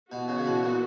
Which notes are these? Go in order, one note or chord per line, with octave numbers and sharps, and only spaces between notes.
B2 E3 B3 F#4
C#3
C#3
B2
A#2